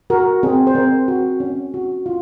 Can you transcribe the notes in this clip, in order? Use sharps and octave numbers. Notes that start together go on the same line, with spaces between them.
F#4 A#4
C4 G#4
C5
C4 A#4
F#4
C#4
F#4
F4